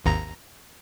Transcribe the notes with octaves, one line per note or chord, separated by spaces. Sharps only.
G#1 D#2 A#5